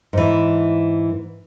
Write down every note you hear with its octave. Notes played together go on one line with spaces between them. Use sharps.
G#2 E3